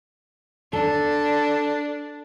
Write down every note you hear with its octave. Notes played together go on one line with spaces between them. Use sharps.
D4 A4